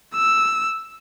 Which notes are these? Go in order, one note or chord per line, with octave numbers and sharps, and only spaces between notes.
E6